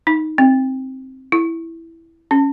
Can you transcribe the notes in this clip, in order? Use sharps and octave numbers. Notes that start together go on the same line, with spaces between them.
D#4
C4
E4
C#4